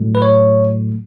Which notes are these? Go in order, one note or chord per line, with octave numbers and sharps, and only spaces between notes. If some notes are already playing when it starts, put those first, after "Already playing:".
Already playing: A2 F#3 A3
B4
C#5